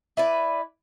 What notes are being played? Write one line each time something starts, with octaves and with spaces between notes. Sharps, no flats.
E4 B4 D5